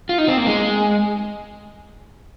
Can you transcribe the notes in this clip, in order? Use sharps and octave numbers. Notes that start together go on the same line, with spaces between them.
F4
D#4
C4
A#3
G#3